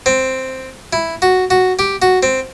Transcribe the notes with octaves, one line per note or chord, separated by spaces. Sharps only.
C4
E4
F#4
F#4
G4
F#4
C4